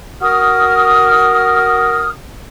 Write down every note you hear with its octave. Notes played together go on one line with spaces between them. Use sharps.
F#4 A#4 D#6 F6